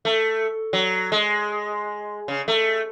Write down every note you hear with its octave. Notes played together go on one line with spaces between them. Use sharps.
A3
F#3
G#3
C#3
A3